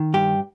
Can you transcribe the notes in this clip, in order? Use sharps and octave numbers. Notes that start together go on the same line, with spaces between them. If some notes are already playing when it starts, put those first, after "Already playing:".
Already playing: D#3
G2 G4